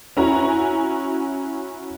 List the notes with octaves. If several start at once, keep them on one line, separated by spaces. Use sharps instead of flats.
C#4 E4 F#4 G#5 A#5